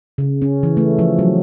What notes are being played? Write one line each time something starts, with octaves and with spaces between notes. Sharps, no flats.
C#3
C#4
E3
A3
F3
F#3